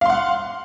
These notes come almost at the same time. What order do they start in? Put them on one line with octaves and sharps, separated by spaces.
F5 C6 F#5